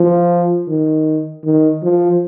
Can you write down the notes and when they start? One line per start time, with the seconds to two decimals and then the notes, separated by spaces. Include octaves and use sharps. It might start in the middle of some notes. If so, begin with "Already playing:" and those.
Already playing: F3
0.68 D#3
1.44 D#3
1.83 F3